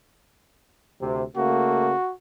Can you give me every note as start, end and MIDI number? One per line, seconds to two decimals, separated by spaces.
1.00 1.23 38
1.00 1.23 48
1.36 1.92 49
1.36 1.92 57
1.36 1.92 58
1.36 2.12 66